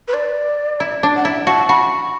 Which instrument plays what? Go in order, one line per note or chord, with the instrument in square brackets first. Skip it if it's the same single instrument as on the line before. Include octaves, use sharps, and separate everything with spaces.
[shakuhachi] B4
D5
[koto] E4
D4
[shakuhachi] F#5
[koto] E4 [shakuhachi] E5
[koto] F#4 [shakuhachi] A5
[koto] F#4 [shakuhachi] B5